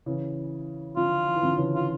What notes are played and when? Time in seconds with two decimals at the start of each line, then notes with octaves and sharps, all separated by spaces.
0.06 C#3 E3
0.96 D3 F3 F4
1.27 F3
1.35 E3
1.43 D3 F3
1.57 C#3 E3
1.75 F4